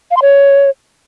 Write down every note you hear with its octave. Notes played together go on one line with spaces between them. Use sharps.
F5
C6
C#5